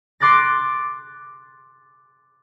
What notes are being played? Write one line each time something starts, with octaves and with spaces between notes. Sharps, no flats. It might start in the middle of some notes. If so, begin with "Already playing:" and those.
C6 D6 F#6 A6 A#6